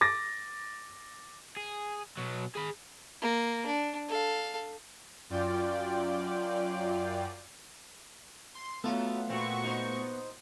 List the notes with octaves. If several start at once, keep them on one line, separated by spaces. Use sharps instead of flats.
D6 A6 A#6
G#4
B2 F#3
G#4 B5
A#3
D4
A4 F5
F#2 F4 D5 G5
C6
F#3 A3 B3 F4 A4
A#2 C4 F#4 C#6
D#4 C5